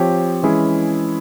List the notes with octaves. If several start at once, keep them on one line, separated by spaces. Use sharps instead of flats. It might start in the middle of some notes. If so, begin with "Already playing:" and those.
Already playing: F3 C4 G4 C#5
E3 G#3 C#4 E4 G#4